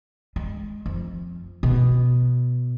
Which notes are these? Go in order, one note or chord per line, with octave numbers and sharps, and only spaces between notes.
G#3
F2
B2